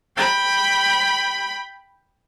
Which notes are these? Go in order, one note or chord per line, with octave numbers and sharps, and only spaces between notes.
G5 B5